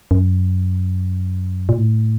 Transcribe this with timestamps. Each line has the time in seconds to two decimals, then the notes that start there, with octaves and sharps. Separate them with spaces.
0.11 F#2
1.69 A#2
1.78 A2